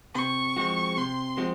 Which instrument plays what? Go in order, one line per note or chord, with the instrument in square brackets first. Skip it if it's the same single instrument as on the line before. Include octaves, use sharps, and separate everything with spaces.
[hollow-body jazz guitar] C3 [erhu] C#6
[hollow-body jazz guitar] F3 G#3 C4 F#4
[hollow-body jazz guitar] C3 [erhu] C6
[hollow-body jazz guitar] F3 G#3 C4 F#4